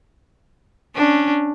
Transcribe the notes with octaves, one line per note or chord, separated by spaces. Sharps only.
C#4 D4